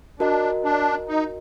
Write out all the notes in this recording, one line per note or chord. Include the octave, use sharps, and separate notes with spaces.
D4 F#4 A#4 D#5
D4
D#4